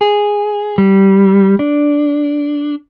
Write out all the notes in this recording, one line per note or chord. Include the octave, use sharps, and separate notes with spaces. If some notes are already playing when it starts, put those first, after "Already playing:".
G#4
G3
D4